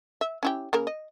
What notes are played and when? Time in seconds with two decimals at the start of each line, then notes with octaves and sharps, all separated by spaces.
0.21 E5
0.43 C#4 E4 G4
0.73 C#3 A#3 A#4
0.87 D#5